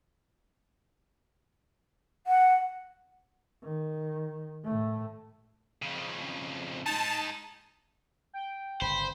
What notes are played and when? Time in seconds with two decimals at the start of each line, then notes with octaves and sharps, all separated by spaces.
2.27 F#5
3.63 D#3
4.65 A2 A3
5.82 F2 C#3
6.86 G#3 D#4 A5
8.33 G5
8.81 G1 C#3 C5 B5